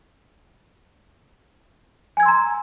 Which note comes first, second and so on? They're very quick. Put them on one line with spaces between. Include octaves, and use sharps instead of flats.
G#5 G#6 E6 C6 A#5